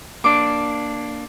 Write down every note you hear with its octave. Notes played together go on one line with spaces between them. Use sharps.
A#3 D4 D6